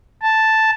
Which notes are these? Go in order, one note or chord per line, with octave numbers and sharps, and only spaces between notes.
A5